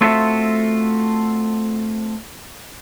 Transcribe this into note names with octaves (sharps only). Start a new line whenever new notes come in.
A3 C4 F4 F#4 A4 E5